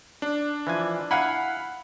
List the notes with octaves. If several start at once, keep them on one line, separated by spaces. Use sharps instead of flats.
D4
E3 F3 G#5
E4 F5 F#5 G#5 B5